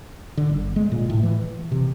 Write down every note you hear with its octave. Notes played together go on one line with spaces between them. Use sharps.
D3
G1
G#3
A#2
A2
E3
C3